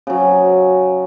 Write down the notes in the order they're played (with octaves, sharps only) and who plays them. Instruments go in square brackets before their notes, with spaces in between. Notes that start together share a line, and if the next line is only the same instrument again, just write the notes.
[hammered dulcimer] C#3 F#3